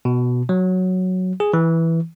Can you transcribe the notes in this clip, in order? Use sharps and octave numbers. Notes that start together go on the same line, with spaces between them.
B2
F#3
G#4
E3